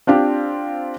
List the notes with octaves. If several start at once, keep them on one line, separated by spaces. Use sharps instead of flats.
C4 D4 F4 G4